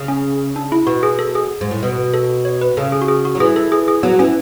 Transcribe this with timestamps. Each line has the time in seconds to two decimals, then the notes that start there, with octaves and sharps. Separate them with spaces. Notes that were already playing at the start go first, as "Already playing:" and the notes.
Already playing: C#3
0.08 C#4
0.56 D4
0.72 E4
0.87 B2 F#4
1.03 G#4
1.19 A4
1.35 G#4
1.61 G#2
1.71 A2
1.83 B2
2.14 A4
2.45 C#5
2.61 B4
2.77 C#3 A4
2.92 G#4
3.02 F#4
3.08 G#4
3.25 F#4
3.35 F#3
3.40 E3 G#4
3.56 A4
3.72 G#4
3.88 G#4
4.03 F#3 B3
4.19 E3 C#4